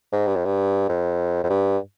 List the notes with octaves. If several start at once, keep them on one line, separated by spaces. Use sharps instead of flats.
G#2
G2
F2
G2
F2
F2
G2